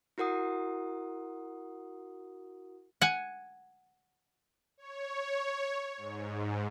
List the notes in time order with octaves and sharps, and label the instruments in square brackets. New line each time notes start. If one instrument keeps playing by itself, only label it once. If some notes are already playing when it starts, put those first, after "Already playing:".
[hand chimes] E4 F#4 A#4 F#5 D#6
[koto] F#5 G#5
[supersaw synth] C#5
G#2